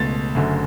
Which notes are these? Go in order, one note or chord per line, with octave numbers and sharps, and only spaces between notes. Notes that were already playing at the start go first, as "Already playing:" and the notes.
Already playing: C#2 B2 A3 A6
F#1 F#2 D3 A3